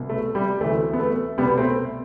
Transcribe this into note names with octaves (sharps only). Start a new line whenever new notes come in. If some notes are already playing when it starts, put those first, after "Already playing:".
Already playing: C2 B2
A3
G3
D2 C3 E3 A3
B3
A3
C2 B2 G3 B3
A3 C4